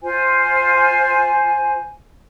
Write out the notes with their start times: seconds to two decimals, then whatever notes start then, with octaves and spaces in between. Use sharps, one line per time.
0.02 F4 C5 G#5